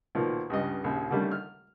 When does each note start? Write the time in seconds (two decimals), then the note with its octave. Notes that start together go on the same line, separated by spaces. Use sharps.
0.15 B1 A#2 D#3 F3
0.50 C#2 G2 D#5
0.84 A#1 D#2 C#3
1.10 D3 D#3 G3 A3 A#3 C#4
1.31 F6